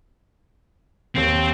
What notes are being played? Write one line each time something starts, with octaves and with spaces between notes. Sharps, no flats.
D#2 C4